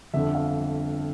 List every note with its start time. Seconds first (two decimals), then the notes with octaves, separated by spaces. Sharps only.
0.13 G1 F2 D3 E5
0.35 F5